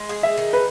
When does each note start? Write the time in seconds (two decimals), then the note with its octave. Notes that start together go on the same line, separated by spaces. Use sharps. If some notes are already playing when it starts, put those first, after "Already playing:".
Already playing: G#3
0.09 G#4
0.23 E5
0.37 D#3
0.53 B4